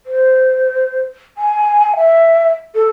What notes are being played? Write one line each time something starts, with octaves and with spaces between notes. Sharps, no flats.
C5
G#5
E5
A4